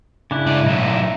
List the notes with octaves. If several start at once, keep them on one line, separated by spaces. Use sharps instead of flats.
C#3 D4 E4
G#2 D5
B1 A2 D#4 E5